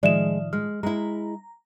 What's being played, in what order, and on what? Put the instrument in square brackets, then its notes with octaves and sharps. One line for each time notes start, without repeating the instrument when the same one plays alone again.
[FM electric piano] A2 D#3 F3 [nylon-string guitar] G#3 [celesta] D5 E5 E7
[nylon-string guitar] G#3 [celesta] F6
[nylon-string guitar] G#3 E4 [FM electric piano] A#5